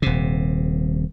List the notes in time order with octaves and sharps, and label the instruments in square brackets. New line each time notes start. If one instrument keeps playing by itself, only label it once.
[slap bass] D#1 C3